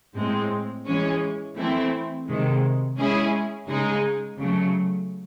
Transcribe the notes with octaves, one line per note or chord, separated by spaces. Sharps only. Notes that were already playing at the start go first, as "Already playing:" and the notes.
A2 G#3 C4
E3 G#3 C#4
E3 A3 C4 E4
C3 D#3 G#3
G#3 C#4 E4 G#4
C#3 G#3 D#4 G#4
C#3 F#3 A3